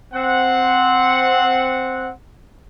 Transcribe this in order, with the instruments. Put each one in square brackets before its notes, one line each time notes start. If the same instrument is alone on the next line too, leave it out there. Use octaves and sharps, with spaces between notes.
[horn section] C4 F#5